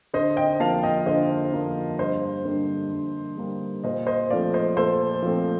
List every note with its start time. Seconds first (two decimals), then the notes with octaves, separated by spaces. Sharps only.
0.14 D3 C5 D#5
0.37 D#5 G5
0.60 F3 A#3 F5 A5
0.83 D#5 G5
1.06 D3 C5 D#5
1.53 F3 A#3
1.99 G2 C5 D#5
2.45 D3 G3 A#3
2.92 G2
3.37 D3 G3 A#3
3.84 A#2 C5 D#5
4.07 C5 D#5
4.30 F3 A3 C4 D5 F5
4.53 C5 D#5
4.77 A#2 A4 C5
5.22 F3 A3 C4